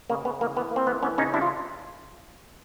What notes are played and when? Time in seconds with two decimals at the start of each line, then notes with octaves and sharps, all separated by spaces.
0.10 C#3 A#3
0.25 C#3 B3
0.41 E3 A#3
0.56 E3 B3
0.71 A#3 C4
0.87 E3 B3
1.03 E3 B3 C#4
1.18 C#3 C#4 D#4
1.34 G3 D4 E4
1.41 F4